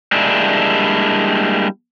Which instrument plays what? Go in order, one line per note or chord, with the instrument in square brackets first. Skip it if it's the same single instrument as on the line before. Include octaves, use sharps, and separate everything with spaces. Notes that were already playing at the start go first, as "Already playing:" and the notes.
[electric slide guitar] G3 G#3 A#3 D4 E4